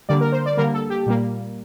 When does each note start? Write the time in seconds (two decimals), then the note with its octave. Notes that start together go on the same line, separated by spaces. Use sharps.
0.09 D3 G3 A#3 D5
0.21 A#4
0.32 C5
0.46 D5
0.57 D3 G3 A#3 A#4
0.74 A4
0.90 G4
1.06 A#2 G3 A#3